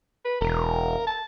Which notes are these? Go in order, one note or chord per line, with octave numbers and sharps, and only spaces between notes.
B4
E1 A#4
A5